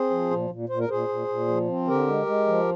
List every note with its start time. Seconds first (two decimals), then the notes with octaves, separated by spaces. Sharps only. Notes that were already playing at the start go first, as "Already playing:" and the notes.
Already playing: C4 G#4 C5
0.10 F3
0.31 A#2
0.50 A#2
0.69 A#2 C5
0.79 A#4
0.89 A#2 G#4 C5
1.08 A#2
1.28 A#2
1.48 F3
1.68 C4
1.87 D3 G4 A#4
2.07 G#3
2.26 G#3
2.47 F3